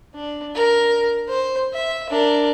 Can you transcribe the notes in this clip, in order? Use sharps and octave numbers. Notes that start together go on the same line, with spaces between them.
D4
A#4
C5
E5
D4 A#4